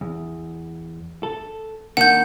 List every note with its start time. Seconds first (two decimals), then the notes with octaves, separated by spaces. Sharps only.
0.01 E2
1.23 A4
1.97 D#3 A#3 D4 F#5 G6